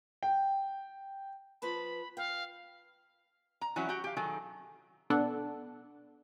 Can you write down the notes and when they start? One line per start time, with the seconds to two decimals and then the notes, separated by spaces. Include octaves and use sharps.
0.23 G5
1.62 F3 B4 A5 B5
2.17 F5 G5
3.61 A#5
3.76 E3 F#3 C#4 E4 F#4
3.89 F#4 G4 G5
4.04 G4 F5
4.17 D#3 F#3 G#4 A4
5.10 B2 D4 A4 F#5